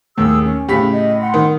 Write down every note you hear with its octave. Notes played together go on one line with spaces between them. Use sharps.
D#2 A2 G#4 E6
C#4
A2 C#3 G4 B6
D#5
F#5 C6
D#3